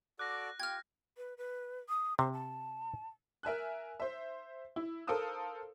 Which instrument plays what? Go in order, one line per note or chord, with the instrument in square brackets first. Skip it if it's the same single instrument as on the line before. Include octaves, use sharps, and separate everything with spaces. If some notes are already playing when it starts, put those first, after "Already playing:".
[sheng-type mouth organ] F#4 A4 D5 [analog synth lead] D6 [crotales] F#6 A#6
[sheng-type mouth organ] F4 G4 [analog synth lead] G5 [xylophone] F6 G#6
[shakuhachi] B4
B4
D#6
[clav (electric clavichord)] C3 [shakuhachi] C5
[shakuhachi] A5
[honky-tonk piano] A#4 E5 G#5 F#6
C5 E5
E4
A4 A#4 C5 F5 D#6 E6